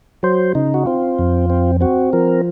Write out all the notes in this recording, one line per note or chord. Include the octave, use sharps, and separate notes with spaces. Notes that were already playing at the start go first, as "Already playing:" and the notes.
F#3 C5
C#3 D#4
F#4
C4 F4
F2
C4
C4 F#4
F3 A#4